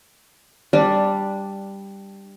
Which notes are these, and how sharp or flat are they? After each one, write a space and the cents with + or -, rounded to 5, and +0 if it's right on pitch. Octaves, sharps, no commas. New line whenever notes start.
G3 +5 D4 +0